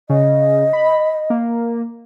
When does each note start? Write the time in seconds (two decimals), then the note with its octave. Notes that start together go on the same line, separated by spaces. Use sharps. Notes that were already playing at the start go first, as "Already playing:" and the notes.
0.09 C#3 D#5
0.73 B5
1.30 A#3